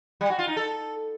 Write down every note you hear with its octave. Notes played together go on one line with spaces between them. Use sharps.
G3
F#4
F4
D#4
A4